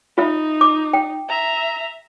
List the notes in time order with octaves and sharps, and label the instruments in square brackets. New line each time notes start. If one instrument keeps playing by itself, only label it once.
[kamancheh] D#4 [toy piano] F4 E5
[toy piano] D6
G5
[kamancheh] E5 A#5